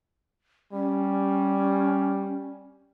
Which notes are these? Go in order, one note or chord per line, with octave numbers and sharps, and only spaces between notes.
G3 C#4